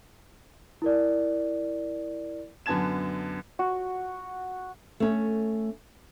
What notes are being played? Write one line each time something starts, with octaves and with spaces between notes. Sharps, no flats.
E4 A#4 D5
F#2 D3 B3 A5 G#6 E7
F#4
A3 C#4